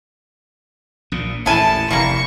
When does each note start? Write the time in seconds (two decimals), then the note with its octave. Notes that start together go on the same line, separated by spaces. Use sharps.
1.12 A#1 A#2
1.46 A1 E2 A#2 E4 A4 G#5 A5
1.90 F1 E2 E3 G3 A#3 C#6